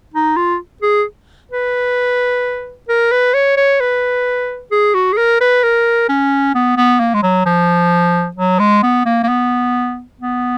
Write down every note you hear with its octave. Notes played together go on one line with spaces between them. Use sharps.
D#4
F4
G#4
B4
A#4
B4
C#5
C#5
B4
G#4
F#4
G#4
A#4
B4
A#4
C#4
B3
B3
A#3
G#3
F#3
F3
F#3
G#3
B3
A#3
A#3
B3
B3